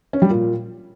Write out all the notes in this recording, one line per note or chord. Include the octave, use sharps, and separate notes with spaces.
C#4
G3
A#2